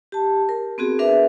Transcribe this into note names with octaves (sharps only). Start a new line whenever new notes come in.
G4 A5
A#4
B3 C4 F#4 G#4
D4 G#4 A#4 B4 E5